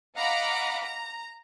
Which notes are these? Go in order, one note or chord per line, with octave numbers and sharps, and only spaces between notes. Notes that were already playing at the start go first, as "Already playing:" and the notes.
D#5 F5 F#5 A#5 B5 D6
A#5